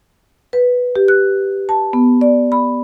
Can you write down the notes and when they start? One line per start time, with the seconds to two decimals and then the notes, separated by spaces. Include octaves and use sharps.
0.53 B4
0.96 G4
1.08 F#6
1.69 A5
1.93 B3
2.21 D5
2.52 B5